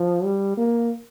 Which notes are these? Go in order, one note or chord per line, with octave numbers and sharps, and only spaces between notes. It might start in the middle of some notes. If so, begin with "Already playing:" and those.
Already playing: F3
G3
A#3